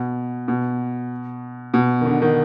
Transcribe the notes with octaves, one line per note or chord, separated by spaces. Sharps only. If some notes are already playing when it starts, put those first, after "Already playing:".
Already playing: B2
B2
B2
D#3
D3
D#3